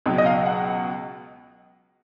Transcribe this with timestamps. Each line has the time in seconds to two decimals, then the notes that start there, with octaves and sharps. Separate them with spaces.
0.06 C#2 B2 F#3
0.18 D#5
0.26 F5
0.46 F#5